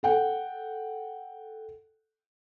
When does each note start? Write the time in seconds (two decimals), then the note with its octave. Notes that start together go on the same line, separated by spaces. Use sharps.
0.03 A4 F#5 G5